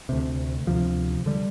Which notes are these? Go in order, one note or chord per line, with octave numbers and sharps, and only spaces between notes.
D2 C3
D2 C3 F3
D3 G3